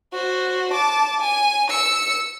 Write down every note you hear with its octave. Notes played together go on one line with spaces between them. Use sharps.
F#4 C5
A5 D6
G#5
E6 C#7